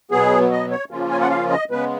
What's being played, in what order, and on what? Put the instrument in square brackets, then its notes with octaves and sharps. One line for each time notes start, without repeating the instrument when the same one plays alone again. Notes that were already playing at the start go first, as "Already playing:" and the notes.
[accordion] B2 F#3 B3 G#4
D#5
C#5
C#3 F3 A#3 C#4 F4
G#5
F#5
F5
D#5
C#3 G#3 B3 B4